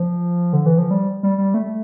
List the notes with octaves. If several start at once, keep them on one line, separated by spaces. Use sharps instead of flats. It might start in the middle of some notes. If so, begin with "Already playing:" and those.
Already playing: F3
D3
E3
F3
G3
G3
G3
A3